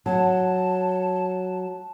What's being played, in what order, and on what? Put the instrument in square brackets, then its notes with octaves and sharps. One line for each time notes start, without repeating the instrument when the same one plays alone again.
[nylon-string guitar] F#3 [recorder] A5